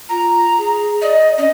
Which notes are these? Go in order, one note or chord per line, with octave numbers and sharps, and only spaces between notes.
F4 A#5
G#4
D5 D#5
C#4 D#5